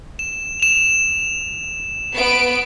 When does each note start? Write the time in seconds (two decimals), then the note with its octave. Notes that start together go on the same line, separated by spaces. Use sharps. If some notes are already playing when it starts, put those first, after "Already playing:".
0.19 E7
0.60 E7 F7
2.15 B3 D7